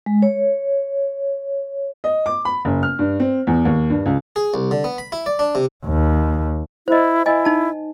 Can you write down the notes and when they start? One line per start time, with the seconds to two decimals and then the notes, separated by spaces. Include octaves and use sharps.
0.06 G#3
0.22 C#5
2.04 D#5
2.26 D6
2.45 B5
2.65 F#1
2.83 F6
2.99 G2
3.20 C4
3.47 E2
3.65 D#2
3.90 G2
4.06 C#2
4.36 G#4
4.54 C2
4.71 D3
4.84 B3
4.98 B5
5.12 E4
5.26 D5
5.39 D4
5.55 C3
5.86 D#2
6.88 E4 C5 D#5
7.26 E4 D#5 G#5
7.45 D#4 A5